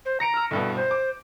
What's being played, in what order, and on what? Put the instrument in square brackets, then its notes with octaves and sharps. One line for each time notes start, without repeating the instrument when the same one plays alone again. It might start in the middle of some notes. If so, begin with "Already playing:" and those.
[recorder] C5
[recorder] A#5 [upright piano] A#6 C#7 D7
[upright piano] E6 F6
[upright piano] C2 G2 B2 [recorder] A4
[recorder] C5
[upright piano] D6